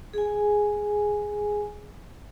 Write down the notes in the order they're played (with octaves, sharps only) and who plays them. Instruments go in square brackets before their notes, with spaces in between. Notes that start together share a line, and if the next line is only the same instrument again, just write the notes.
[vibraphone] G#4 G#5